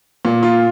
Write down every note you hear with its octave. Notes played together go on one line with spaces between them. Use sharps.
A#2
F4